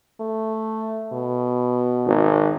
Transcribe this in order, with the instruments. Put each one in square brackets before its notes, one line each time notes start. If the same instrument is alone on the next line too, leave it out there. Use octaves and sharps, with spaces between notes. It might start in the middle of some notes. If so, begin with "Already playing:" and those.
[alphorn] A3
B2
[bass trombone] G#1